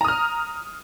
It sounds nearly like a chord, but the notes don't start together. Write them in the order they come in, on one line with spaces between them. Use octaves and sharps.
A#5 D#6 F6